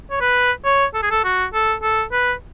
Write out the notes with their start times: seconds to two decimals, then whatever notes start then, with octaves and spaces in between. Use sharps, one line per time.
0.10 C#5
0.21 B4
0.65 C#5
0.94 A4
1.02 G#4
1.10 A4
1.24 F#4
1.53 A4
1.82 A4
2.12 B4